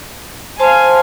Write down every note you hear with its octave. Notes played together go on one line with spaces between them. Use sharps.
C5 F5 G#5 A5 C6